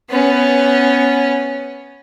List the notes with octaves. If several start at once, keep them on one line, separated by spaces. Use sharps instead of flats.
B3 C#4